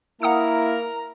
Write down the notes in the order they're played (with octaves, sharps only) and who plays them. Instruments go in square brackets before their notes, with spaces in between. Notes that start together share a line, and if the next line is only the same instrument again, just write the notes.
[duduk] A#3 [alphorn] E4 [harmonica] A#4 A#5 [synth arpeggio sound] F#5 D#6 C#7